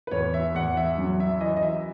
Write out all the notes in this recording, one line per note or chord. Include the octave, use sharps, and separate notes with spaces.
B4
E2 C#5
E5
E2 F#5
E5
F#2
E5
E3 D#5
D#5
E5